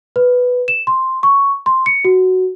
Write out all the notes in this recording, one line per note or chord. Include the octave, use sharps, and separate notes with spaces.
B4
E7
C6
C#6
C6
C#7
F#4